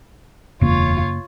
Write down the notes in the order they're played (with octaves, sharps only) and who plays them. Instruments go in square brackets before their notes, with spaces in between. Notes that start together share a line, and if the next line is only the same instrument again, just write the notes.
[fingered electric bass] E1 [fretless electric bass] F#2 C#3 A#3 [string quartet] F4 C#5